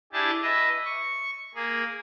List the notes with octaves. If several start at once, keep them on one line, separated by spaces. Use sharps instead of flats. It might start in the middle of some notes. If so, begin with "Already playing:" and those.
D4 E4 G4 G#4 A5
B4 D#5 E5
C#6
A#3 G#4